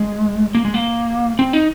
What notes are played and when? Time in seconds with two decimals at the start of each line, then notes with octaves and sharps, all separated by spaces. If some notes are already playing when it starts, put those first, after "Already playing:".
Already playing: G#3
0.55 A#3
0.65 G#3
0.74 A#3
1.39 C4
1.53 D#4